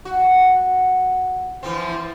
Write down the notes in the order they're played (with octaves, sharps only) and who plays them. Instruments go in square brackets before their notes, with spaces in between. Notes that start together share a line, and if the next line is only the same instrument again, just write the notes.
[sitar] F#4
E3 F3 C4